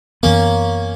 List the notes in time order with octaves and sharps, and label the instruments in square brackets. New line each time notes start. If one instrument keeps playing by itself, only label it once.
[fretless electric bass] F#2 E3 B3 [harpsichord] A#3 C#4